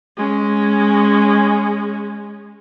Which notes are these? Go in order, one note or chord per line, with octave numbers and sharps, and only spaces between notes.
G#3 C#4